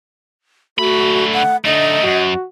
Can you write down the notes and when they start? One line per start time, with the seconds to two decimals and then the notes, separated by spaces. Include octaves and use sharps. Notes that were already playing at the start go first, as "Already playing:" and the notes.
0.79 D3 A3 F#4 B5
1.33 F#5
1.65 D3 A3 D#4 D#5
2.04 F#2 F#4